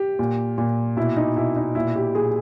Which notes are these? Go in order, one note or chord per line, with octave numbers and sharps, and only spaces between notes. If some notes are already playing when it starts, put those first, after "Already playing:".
Already playing: G4
A#2
A#2
B2 E4
D#4
B2 E4
D#4
A#2 E4
G4
A#2 G#4